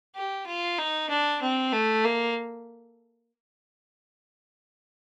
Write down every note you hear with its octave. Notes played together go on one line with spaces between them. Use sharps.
G4
F4
D#4
D4
C4
A3
A#3